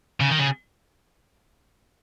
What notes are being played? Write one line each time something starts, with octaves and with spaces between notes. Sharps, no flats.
C#3
D#3
C#3